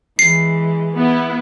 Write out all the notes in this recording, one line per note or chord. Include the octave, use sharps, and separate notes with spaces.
E3 G#3 C7
B3 E4